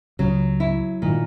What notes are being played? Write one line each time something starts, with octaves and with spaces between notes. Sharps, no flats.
C#2 C#3 F#3
E4
A#2 D#3